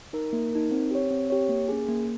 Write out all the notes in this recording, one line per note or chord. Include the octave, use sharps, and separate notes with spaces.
D#4 A#4
A#3
D#4 A#4
C4
G4 C#5
C4
G4 C#5
A#3
C#4 G#4
A#3